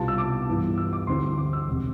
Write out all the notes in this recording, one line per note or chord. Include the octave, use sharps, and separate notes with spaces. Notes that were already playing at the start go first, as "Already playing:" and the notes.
Already playing: C2 B2 G3 B3 F4 A5
E6
D6
G2 E3 B3 E4
E6
D6
D2 D3 G3 C4 E4 C6
D6
E6
E1 C3